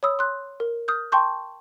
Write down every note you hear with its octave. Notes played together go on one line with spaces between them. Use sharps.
C#5 B5 D#6 E6
C6 F#6
A#4
D#6 F6 G6
G5 A5 C6 C#6 G6